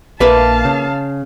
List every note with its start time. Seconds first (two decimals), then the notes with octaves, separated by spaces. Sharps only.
0.20 A#1 A#3 B4 E5 F5 A5
0.65 C#3